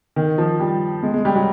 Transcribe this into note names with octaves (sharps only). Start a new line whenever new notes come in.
D#3
F3
G3
G#3
G#3
G3
F#3